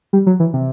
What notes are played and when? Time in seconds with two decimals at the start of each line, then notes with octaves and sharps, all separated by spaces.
0.13 G3
0.26 F#3
0.40 E3
0.53 C3